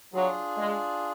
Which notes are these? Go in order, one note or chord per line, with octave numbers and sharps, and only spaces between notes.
F#3 D4 F4 G#4
G#3